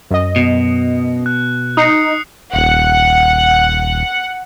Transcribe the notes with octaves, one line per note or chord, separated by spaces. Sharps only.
F#2 D#5
B2
F#6
D#4 D#6 C7 C#7
D#1 F#5